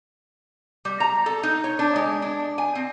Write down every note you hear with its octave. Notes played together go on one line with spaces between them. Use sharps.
G3
A#5
A4
D#4
C#5
D4
G#3
D4
G#5
C4